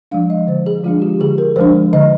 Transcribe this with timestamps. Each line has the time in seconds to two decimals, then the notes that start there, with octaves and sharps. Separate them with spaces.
0.11 F3 G#3 D4 F5
0.30 D#5
0.47 D3 C5
0.66 G#4
0.84 F3 G#3 D4 F4
1.02 G4
1.20 D3 G#4
1.38 A#4
1.56 F3 G#3 D4 C5
1.93 D3 D#5